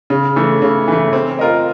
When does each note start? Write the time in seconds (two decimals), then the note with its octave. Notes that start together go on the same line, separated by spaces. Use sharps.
0.10 C#3
0.36 E3 A3
0.62 C#3
0.88 E3 A3
1.13 C4
1.39 F4 A#4 D#5